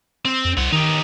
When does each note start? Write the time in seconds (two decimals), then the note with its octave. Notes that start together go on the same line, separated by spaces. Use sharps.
0.25 C4
0.45 F2
0.57 C2 C4 F#5
0.72 D#3 D#4 G4